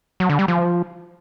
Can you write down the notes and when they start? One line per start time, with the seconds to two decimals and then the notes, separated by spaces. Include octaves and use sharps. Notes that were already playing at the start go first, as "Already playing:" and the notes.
0.20 F#3
0.29 D3
0.39 G3
0.48 F3